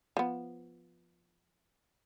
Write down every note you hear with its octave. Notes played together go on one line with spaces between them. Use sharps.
F3 B3